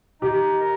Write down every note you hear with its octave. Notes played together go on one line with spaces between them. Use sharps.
D#4 G4
A#4